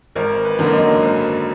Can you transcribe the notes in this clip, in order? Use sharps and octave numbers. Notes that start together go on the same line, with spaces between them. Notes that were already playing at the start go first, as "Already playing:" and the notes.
G#1 A#4
B4
F#2 D3 F#3 A#3
D#5
G#1